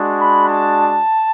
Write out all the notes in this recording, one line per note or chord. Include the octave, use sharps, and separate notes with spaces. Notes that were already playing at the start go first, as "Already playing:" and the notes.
Already playing: G#3 D4 F#4
B5
A5